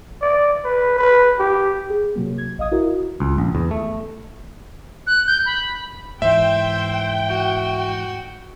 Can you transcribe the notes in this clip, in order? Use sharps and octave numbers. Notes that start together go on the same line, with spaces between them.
D5
B4
B4
G4
G#4
C3 F#3 A#3
G#6
A#1 D#5 F5 D#6 G#6
E4 F#4 A#4
C#2
A#1
E2
A3
F#6
G6
B5
G#2 E3 C5 E5 G5
F#4